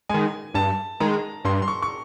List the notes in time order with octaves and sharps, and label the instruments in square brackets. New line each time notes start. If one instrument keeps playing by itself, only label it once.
[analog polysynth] D#3 G#3 [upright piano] G#5
[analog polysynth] G2 [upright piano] A5
[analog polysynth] D#3 G#3 [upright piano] A#5
[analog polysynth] G2 [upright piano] C6
[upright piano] C6
C#6
C#6